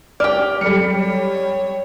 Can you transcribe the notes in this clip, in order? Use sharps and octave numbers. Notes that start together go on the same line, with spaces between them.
G4 D5 F6
F#3 G3 A4 C#7
C#5
G5